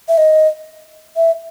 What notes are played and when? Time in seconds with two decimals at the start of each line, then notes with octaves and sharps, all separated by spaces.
0.08 E5
0.18 D#5
1.16 E5